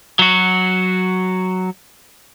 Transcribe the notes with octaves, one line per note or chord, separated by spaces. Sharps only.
F#3 F#4